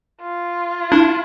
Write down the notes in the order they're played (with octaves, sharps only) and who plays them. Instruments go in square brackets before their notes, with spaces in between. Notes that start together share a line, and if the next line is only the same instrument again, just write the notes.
[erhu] F4
[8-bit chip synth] D4 E4